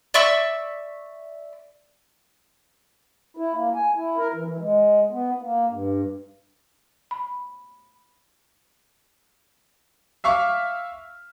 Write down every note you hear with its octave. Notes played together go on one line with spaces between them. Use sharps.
D5 E5 C#6 E6
E4
A#3
G#5
E4
A#4
E3
E3
G#3
B3
A#3
G2
B5
E5 F5 C#6 D6 F6